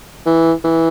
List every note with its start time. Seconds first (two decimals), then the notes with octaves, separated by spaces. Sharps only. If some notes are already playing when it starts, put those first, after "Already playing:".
0.26 E3
0.64 E3